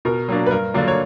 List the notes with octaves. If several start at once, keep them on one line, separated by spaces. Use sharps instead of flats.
B2 A#4
F#3 A#3 D4
B4
G2 A#4
D3 F#3 A#3 D4 D5
C#5